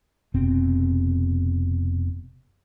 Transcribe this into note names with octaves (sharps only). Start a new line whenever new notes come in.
F1 B2 C4